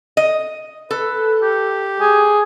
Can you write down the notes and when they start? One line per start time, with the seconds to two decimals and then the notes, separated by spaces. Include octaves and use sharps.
0.17 D#5
0.91 A4 B4
1.42 G4
2.00 G#4